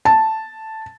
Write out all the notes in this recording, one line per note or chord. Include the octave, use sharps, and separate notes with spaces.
A5